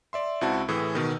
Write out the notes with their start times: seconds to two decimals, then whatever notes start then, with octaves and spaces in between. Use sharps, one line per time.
0.13 D5 E5 C6
0.41 C#2 C4 E4 F#4 F#5 A5
0.68 A2 E3 G#4 E6
0.95 B2 D#3